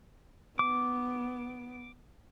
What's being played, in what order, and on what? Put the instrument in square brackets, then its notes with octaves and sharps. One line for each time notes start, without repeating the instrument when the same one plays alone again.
[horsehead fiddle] B3 [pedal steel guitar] D6